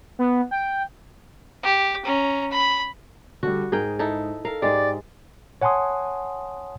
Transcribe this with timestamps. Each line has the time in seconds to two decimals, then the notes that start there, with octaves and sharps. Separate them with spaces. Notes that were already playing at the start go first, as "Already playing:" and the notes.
0.19 B3
0.51 G5
1.63 G4
2.05 C#4 A#5
2.51 B5
3.43 D3 G3 F#4
3.72 G#2 G#4 A#4 G5
3.99 D#4 E4 A4
4.45 A4 A#4 F5
4.62 G#2 G#3 G4 D5 A6
5.62 C#5 F#5 G#5 A5 C6 D#6